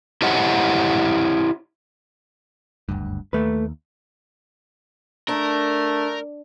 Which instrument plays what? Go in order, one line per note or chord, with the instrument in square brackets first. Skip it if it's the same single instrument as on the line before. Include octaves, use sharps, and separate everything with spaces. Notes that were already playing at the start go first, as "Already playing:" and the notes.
[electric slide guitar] E4 G4 C5 C#5 D#5 F#5
[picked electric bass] F#1 D2 G2
[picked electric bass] D#2 [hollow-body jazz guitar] A3 B4
[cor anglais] A3 [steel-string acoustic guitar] D4 [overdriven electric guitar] A#4